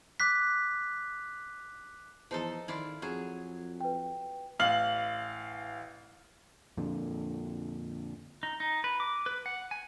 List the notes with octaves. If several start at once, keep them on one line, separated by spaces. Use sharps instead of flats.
D6 F#6 B6
E2 F3 D#4 A4
D#3 E4 F4 D5
F2 F#3 G#4
B4 G5
A1 F5 F#7
F2 A#2 D3
D#4
D#4
B4
D6
B4
F#5
G#5